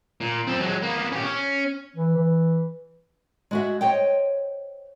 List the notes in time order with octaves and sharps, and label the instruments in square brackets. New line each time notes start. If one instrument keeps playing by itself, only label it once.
[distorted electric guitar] A#2
C4 A4
F#3 G#3
A#3 B3
C#4 G4
C#4
[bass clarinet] E3
E3
[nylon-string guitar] G#3 F#4 E5
C5 C#5 D#5 G5